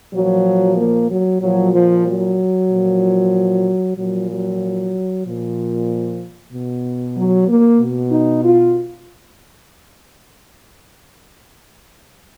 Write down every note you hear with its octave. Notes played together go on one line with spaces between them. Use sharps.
A#2 F3 F#3
A#3
F#3
A#2 F3 F#3
F3
F#3
A#2 F3
A#2 F3 F#3
F#3
A#2 F3
B2
F#3
A#3
B2
D#4
F4